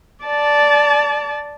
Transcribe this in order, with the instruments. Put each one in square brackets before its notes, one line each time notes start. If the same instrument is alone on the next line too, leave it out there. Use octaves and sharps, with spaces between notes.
[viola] D5 A5